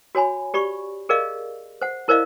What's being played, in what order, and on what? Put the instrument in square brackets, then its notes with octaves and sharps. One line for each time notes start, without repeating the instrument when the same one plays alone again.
[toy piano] F#4 C#5 G#5 B5
G4 D5 B5 C#6
G#4 A#4 D5 D#5 F5
C5 F#5
E4 A#4 C5 D5 D#5 F5